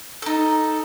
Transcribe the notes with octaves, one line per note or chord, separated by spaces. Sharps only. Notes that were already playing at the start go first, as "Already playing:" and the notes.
D#4 A4